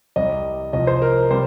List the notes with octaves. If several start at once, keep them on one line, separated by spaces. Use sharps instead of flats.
C2 C3 G3 D#5
C2 C3 F3 D#5
C5
A#4
C3 G3 C5